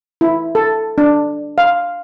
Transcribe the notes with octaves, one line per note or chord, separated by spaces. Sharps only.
E4
A4
D4
F5